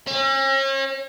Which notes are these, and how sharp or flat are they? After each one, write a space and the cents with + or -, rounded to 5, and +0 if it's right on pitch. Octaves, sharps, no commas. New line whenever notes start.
C#4 -40